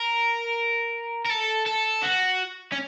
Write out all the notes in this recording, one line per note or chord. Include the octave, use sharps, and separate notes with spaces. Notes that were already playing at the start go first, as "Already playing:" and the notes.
Already playing: A#4
A#4
A4
A4
F#4
C#4